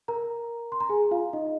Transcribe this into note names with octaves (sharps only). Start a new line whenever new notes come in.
A#4 A#5
C6
A#5
G#4 G#5
F4 F5
D#4 D#5